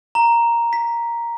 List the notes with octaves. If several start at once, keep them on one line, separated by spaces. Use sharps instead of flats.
A#5
B6